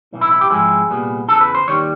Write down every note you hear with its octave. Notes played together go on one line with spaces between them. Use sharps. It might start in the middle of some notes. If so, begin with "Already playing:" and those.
B1 A2 E3
E4
E4
G4
G#2 F3 G#3 C4 E4 G#4
C2 A#2 G3 B3
E2 C#3 E3 A4
B4
C5
D#2 D#3 G3 C#5